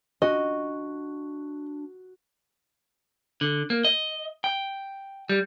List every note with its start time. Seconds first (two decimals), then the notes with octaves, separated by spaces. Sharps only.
0.22 D4 F#4 D#5
3.41 D3
3.70 A#3
3.85 D#5
4.44 G5
5.29 G3